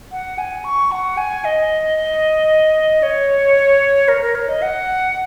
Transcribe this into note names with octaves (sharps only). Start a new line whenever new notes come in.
F#5
G#5
C#6
F#5
G#5
D#5
C#5
A#4
A#4
C#5
D#5
F#5